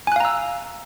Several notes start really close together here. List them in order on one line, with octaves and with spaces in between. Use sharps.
G#5 F#6 F5 A#5 E6